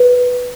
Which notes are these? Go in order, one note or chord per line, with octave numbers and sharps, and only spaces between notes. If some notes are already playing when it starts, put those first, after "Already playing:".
Already playing: B4